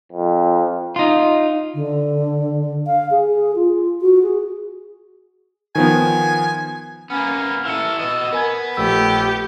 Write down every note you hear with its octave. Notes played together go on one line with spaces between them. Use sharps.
F2
D#4 F4
D3
F5
G#4
F4
F#4
G#4
D#3 F3 B3 G#5
A#3 B3 C#4
E3 A4 E6 F6 C#7
F#4 D#5
B3 A#4 G#5 G#6
A#1 A3 G4 A4 E6